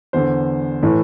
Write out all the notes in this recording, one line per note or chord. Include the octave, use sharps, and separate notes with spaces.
E2 D3 C5
A2 E3